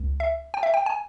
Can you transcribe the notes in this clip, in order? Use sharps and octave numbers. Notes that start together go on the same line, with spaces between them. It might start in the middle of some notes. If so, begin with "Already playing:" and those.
Already playing: C#2
E5
G5
E5
G5
G#5